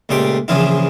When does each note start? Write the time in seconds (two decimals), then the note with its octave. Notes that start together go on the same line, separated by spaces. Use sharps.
0.09 C#2 A#2 A3 G4 C6 D6
0.48 A#1 C#3 E3 F3 E4 F4